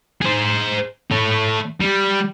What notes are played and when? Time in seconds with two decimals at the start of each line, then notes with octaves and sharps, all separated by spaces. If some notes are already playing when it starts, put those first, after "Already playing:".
0.21 G#4 C5
1.12 A3 C#5
1.81 G3